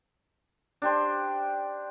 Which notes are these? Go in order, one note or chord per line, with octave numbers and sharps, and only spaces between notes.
D4 G4 C5